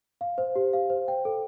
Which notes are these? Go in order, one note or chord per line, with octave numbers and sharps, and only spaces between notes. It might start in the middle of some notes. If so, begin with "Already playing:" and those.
F5
C5
G4
F5
C5
G5
A4